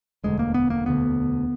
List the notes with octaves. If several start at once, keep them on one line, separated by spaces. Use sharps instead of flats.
E1 D2 D3 G#3
A#3
B3
A#3
E1 D2 D3 B3